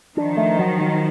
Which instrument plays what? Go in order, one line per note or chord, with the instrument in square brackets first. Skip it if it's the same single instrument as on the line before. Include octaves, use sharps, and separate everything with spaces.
[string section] D#3 F3 [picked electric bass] D4
[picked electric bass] A3
F#3
F#3